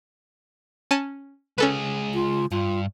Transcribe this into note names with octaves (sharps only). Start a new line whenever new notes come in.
C#4 A5 D#7
C#2 C#4 G#4 A4 B4
F4
G2 F4